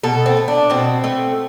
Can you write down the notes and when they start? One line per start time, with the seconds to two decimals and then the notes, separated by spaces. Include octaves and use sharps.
0.03 B2 A4
0.26 C4
0.37 A3
0.48 D4
0.70 B2 C4
1.04 A3